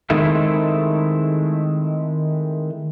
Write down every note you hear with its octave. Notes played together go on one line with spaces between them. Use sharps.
D#3 G#3 A3 C4 E4 A4